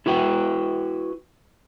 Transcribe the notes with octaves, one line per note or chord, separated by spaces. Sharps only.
E4 F#4 B4 G5